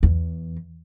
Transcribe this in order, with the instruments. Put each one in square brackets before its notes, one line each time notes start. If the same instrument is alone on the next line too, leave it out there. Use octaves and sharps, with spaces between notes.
[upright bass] E2